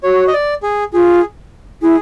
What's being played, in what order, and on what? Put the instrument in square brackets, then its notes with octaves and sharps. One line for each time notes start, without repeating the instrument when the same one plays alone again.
[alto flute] F#4 [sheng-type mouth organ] C#5
[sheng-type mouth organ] D#5
D5
G#4
[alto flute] F4 [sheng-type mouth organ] G#4
[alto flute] E4 [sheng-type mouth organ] G#4